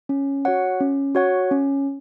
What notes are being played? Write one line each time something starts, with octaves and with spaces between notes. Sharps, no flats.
C#4
F#4 C#5 F#5
C#4
F#4 C#5 F#5
C#4